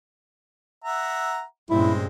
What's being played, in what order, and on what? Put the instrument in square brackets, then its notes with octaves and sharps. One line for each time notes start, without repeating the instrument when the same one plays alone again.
[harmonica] E5 F#5 A#5
[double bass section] G2 A#2 C#3 [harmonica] G#3 C4 [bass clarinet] E4